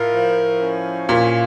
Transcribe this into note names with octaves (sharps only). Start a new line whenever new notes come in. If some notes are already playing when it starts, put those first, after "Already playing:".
Already playing: A2 F4 A#4
F3
C#4
A#2 F4